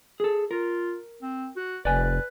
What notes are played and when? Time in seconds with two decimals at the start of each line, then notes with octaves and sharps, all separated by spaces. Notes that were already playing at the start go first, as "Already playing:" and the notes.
0.20 G#4 A4
0.51 F4 A#4
1.22 C4
1.56 F#4
1.85 F1 B4 D5 G#5